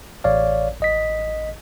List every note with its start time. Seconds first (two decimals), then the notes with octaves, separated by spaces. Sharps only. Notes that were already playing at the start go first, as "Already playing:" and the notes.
0.24 A1 C#5 D5 F5
0.80 A1 D#5 B6